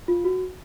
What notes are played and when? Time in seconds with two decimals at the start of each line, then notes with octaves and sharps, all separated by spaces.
0.08 F4
0.24 F#4